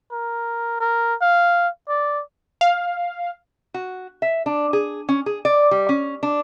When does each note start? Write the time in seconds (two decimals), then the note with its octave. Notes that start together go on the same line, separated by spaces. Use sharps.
0.12 A#4
0.80 A#4
1.21 F5
1.89 D5
2.61 F5
3.74 F#4
4.22 E5
4.46 D4
4.73 G#4
5.09 C#4
5.26 G#4
5.45 D5
5.71 G3
5.89 C#4
6.23 D4